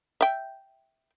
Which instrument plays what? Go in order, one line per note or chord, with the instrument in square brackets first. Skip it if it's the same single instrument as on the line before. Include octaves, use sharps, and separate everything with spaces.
[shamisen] E5 G5